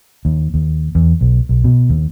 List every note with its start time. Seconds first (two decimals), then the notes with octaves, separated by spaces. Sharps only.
0.25 D#2
0.54 D#2
0.95 E2
1.21 B1
1.49 B1
1.64 B2
1.89 D#2